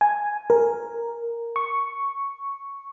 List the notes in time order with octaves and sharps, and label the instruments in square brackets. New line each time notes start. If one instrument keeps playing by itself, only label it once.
[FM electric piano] G#5
A#4
C#6